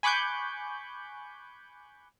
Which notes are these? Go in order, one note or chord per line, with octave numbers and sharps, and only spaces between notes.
G#5 B5 C#6 D6 F#6 G6